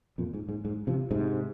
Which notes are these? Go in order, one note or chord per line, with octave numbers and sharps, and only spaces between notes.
F2 A#2
G#2
G#2
G#2
C3 F3
G#2 C3